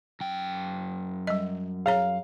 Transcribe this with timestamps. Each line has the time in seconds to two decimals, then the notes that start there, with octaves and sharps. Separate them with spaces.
0.21 F#2 G5
1.27 G3 D#5
1.86 G#4 C#5 F5 A#5